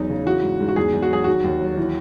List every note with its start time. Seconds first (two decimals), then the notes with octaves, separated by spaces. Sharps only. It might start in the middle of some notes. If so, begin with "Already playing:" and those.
Already playing: E2 F#3 D#4
0.10 C#3
0.26 E3 F#4
0.43 G#2
0.60 G#2
0.69 F#4
0.76 E2 G#4
0.93 E2
1.02 F#4
1.11 F#3 G#4
1.24 D#3 F#4
1.44 D#2
1.60 F#3
1.77 E3